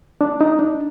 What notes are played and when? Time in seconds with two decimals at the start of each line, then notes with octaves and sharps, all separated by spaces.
0.21 D4
0.41 D#4
0.59 D4